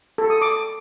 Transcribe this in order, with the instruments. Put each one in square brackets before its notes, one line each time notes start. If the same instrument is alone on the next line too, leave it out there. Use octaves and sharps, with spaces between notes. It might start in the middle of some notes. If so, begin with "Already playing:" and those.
[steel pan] A4
D#6
D6